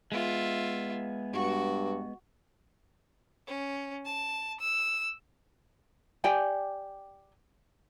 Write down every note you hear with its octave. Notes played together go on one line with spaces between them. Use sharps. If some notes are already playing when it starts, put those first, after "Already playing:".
G#3 B3 F4 E5
G2 F#4
C#4
A5
E6
G4 D5 G5 G#5